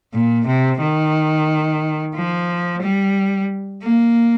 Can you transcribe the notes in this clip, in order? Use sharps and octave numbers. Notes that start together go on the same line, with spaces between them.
A#2
C3
D#3
F3
G3
A#3